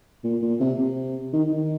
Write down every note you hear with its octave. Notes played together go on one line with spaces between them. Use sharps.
A#2
A#2
C3
C3
D#3
D#3